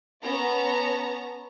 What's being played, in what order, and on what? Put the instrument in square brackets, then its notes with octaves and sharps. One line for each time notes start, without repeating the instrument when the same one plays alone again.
[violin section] B3 C#4 A5 A#5